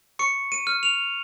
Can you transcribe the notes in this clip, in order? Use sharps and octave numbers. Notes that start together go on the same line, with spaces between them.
C#6 C#7
D#7
F6
F7